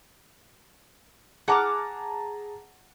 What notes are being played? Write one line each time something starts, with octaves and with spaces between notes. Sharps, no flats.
G#4 F#5 A5 A#5 D6 F6